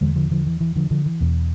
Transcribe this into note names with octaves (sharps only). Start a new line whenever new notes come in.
E2 D3 E3 G#3
D3 F3
D3 F3
E3
E3
D3 F3
D3 F3
E3
E2 B2